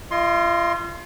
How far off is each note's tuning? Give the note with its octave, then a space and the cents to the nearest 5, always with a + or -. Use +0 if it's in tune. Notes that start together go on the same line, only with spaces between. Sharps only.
F4 -35 D#5 +0 C6 +15